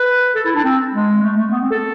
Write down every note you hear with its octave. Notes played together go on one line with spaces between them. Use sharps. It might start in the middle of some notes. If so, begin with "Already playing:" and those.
Already playing: B4
A4
E4
D4
C4
G#3
A3
A3
B3
C4
A4